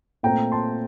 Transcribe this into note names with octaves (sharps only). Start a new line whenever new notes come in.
A#2 A3 C4 G5 A#5
A5 C6